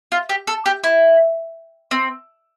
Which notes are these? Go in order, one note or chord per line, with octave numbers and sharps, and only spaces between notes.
F4
G4
A4
G4
E4
C4